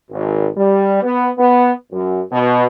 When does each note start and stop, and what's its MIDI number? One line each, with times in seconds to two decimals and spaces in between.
0.11 0.48 32
0.56 1.01 55
1.02 1.30 59
1.38 1.71 59
1.92 2.21 42
2.31 2.65 47